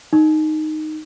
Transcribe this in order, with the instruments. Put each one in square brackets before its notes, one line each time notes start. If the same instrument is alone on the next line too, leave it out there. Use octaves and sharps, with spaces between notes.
[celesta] D#4